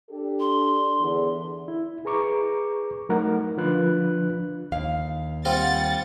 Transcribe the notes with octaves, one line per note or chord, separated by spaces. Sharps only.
D4 G4 A4
C6
E2 D3
E4
G#4 B4 A#5 C#6 D6
F#3 A3 D#4 A#4 F#5
D3 F3 D4 F4 B4 F#6
D#2 F5
G3 C4 F4 F#5 A6